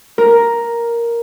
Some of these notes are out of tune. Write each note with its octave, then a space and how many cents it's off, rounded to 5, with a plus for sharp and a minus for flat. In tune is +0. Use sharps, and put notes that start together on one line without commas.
A#4 +5